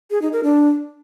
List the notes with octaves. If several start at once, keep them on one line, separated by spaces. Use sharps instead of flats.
G#4
D#4
A#4
D4